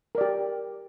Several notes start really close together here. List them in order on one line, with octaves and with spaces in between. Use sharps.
A#4 D5 G4